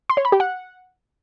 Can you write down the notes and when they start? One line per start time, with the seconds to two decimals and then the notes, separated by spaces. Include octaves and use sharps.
0.10 C6
0.17 C#5
0.25 B5
0.32 G4
0.40 F#5